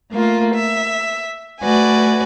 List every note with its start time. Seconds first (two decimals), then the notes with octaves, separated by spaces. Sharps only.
0.11 A3 A#3 F4
0.54 E5
1.61 A3 F#4 B4 D5 G#5